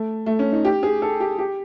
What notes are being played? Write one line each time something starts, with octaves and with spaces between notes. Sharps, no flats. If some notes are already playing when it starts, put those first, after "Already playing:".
Already playing: A3
A3
C#4
D#4
G4
G#4
A4
G4
G4